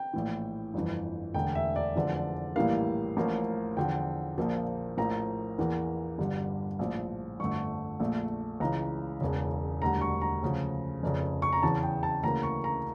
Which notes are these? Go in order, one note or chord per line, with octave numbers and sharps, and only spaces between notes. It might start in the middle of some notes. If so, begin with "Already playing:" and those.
Already playing: G5
A#1 A2 E3
G1 F2 E3
E1 D2 D3 G5
E5
D5
F1 E2 D3 F3
A#1 A2 E3 G3 A#3 F5
A1 A2 F3 A#3
E2 D3 F3 G5
A#1 A#2 F3 A#3
A#1 A2 F3 A#3 A#5
E2 E3 A#3
G1 G2 D3 G3
A#1 A2 F3
G1 F2 D3 A3 C#6
A#1 A#2 A3
C#2 C#3 E3 A#5
E1 E2 C#3
E1 D2 D3 G3 A#5
C#6
A#5
D2 C#3 F3
F1 F2 C#3
C#6
A#5
E2 C#3 E3 A5
G5
A5
D2 C#3 E3 A#3 A#5
C#6
A#5